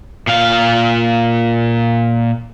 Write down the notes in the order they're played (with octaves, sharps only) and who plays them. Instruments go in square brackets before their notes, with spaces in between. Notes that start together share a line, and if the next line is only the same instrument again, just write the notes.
[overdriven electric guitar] A#2 F5